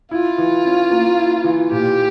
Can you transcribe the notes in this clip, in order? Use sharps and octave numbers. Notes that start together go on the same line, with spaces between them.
E4 F4
E3
C#4
A#3
E4
E3
A#2 G4